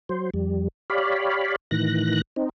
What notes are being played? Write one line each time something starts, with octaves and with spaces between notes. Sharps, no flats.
F#3 C5
F2 G3
G4 C#5 D5 F5 B5
A2 D#3 E3 F#6 A#6
C4 D#4